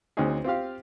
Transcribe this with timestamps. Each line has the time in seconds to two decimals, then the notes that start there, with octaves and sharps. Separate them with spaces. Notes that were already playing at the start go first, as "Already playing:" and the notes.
0.17 D2 C4 C#4 D#4 G#4
0.44 C4 F4 G4 F5